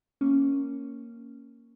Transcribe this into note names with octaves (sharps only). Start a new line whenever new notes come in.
A#3 C#4